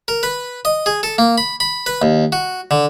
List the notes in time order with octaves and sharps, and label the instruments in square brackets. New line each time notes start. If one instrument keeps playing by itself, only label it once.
[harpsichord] A#4
B4
D#5
G#4
A4
A#3
B5
B5
B4
D#2
F#4
D3